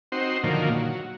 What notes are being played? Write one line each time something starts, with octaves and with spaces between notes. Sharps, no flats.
C4 D#4 F#4 C5
A#2 D3 D#3 F3 F#3 A#3
F#3